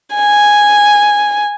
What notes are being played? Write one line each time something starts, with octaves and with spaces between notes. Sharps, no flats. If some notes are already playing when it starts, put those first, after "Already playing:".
G#5